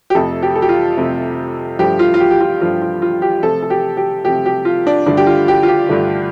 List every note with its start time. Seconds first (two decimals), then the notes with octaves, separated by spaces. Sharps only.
0.10 G4
0.15 F2 C3 A3 A4
0.43 G4
0.56 A4
0.62 G4
0.69 F4
0.97 F2 C3 A3
1.79 G2 F3 A3 G4
1.99 F4
2.14 F4
2.20 G4
2.31 G4
2.41 F4
2.60 G2 F3 A3 F4
2.82 F4
3.02 F4
3.22 G4
3.43 C3 F3 A3 A4
3.62 A4
3.70 G4
3.97 G4
4.25 C3 F3 A3 G4
4.46 G4
4.65 F4
4.87 D4
5.06 G2 D3 A3 D4
5.17 G4
5.27 F4
5.48 G4
5.63 F4
5.68 G4
5.89 G2 D3 A3